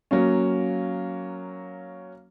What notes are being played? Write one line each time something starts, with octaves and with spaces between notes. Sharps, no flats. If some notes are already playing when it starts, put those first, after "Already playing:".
F#3 A#3 C#4